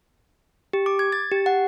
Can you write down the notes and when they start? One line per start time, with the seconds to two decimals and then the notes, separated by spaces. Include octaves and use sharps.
0.73 G4
0.86 D6
0.99 G#6
1.12 A6
1.32 G4
1.46 F#5